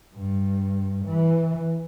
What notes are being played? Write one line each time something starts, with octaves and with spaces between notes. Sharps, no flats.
G2
E3